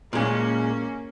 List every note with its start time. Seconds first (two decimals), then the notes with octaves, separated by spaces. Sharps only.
0.13 A#2 G#3 A#3 C#4